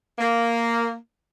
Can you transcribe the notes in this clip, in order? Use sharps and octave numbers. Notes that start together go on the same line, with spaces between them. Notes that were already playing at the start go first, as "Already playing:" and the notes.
A#3